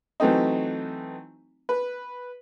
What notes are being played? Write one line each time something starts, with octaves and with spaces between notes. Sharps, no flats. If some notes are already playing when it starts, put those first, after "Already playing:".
E3 F#3 A3 C4 D#4
B4